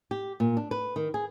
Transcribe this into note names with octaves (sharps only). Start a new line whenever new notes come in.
G4
A#2
D4
B4
D#3
G#4